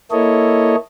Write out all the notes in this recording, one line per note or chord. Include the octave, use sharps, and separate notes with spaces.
A#3 E4 A4 C#5 D#5